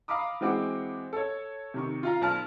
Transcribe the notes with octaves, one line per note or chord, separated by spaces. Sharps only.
F5 A#5 B5 D6 D#6
E3 G#3 C4 F#4 D6
A4 C#5
C3 D#3 C#6
F4 F5 A#5
B1 A5 F6